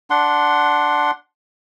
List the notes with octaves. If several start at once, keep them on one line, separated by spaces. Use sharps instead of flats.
D4 F#5 C6